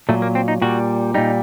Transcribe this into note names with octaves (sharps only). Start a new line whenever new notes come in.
A#2 F#3 A3
A#3
C4
D#4
A#2 G3 F#4
A#2 G3 D#4